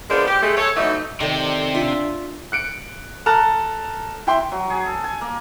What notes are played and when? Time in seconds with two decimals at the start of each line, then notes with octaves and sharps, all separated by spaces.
0.10 G#3 B3 D4 F4 A#4 C5
0.27 G4
0.42 G#3 A3
0.57 A4 C#5
0.76 E3 F#3 A3 B3 D#4
1.20 C3 D#3 A4 D5
1.75 D4 F4 E5
2.52 F#6 C#7 D7
3.26 A4 A5 A#5 F6 F#6
4.27 E4 G5 C6
4.52 F#3
4.70 G#4
4.86 A4
5.04 G#5
5.21 A#3